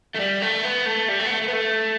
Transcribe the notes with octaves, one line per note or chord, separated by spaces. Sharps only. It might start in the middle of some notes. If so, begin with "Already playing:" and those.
A3
G3
A3
B3
A3
G3
A3
B3
A3
A3
B3
A3